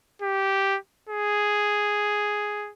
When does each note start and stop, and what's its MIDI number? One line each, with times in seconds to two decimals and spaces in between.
0.22 0.78 67
1.09 2.71 68